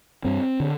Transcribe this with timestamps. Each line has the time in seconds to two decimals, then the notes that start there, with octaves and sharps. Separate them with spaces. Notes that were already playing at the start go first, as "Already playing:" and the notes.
0.24 G2 C4
0.60 D3